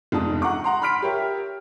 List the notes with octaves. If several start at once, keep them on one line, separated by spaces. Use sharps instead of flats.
F1 E2 G#2 D4 A5 D#6
F#5 A#5 C#6 D6
F#5 A#5 C6
B5 C6 F6 B6 D7
G4 A#4 C#5 E5 G5